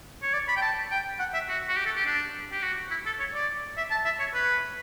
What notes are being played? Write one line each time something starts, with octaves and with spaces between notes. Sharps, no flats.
C#5
D5
B5
G5
A5
G5
F#5
E5
F#4
F#4
G4
A4
G4
D4
G4
F#4
E4
A4
C#5
D5
E5
A5
E5
C#5
B4